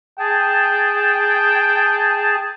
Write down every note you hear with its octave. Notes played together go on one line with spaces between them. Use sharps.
G#4 G5 A5